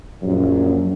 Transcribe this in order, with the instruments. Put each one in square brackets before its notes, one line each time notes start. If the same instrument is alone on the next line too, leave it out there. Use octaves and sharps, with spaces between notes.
[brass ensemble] A#1 F#2